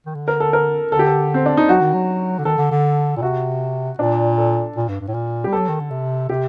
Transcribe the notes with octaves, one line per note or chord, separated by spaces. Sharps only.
D#3
D3
A#4
A4
A#4
D3 A4
G4
A4
C4
D4
D#4
F#3 F#4
D#3
F#3
D3
D#3 A4
D3
D3
A#2
C3 F#4
A#2 D4
A4
A#2
G2
G2
A2
A#2
G3 G4
F#3 A4
D#3
D3
C3
C3 G4